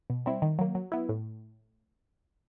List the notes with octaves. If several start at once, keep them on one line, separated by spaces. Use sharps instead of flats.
B2
G3 C4 E4
D#3
F#3 A#3
F#3
B3 E4
A2